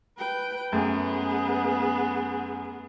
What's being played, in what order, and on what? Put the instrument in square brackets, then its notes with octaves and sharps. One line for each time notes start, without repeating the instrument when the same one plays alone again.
[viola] B4 G5
[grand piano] F#2 [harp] A3 [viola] B3 G#4